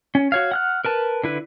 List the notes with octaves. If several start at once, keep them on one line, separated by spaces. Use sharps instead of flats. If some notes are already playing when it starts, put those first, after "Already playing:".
C#4
F#4 C#5 F5
F#5 F6 F#6
A#4 B4 A5
D3 E4 B4